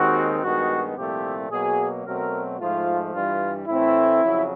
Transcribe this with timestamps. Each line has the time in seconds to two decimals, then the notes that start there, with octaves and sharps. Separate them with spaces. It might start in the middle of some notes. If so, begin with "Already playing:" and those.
Already playing: D#2 D#3 G#3 C4 F#4
0.42 G2 D#3 G#3 B3 F#4
0.97 C2 A#2 F3 A3 C4 G4
1.50 B2 F#3 A#3 G#4
2.05 B2 F#3 A3 C4 A#4
2.60 G#2 F3 A3 F4
3.13 G2 E3 G3 F4
3.67 A2 E3 A3 C4 E4
4.22 F2 C#3 F#3